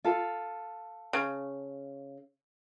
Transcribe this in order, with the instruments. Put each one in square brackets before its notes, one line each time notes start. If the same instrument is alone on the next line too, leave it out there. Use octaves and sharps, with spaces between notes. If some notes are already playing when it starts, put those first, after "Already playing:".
[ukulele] F4 A4
[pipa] C#3